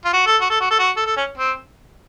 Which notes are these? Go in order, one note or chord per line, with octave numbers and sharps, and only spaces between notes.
F4
F#4
A4
F#4
A4
F#4
A4
F#4
A4
A4
C#4
C4